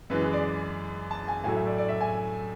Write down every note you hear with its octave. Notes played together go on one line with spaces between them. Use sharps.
F#2 E3 G#3 B4
G#4
D5
A5
G#5
A2 F#3 A3 G#5
E5
D5
D5
E5
G#5